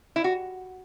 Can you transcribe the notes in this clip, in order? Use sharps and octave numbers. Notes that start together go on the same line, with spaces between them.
E4
F#4